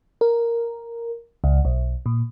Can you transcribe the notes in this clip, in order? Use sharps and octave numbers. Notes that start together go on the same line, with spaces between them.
A#4
C#2
B1
A#2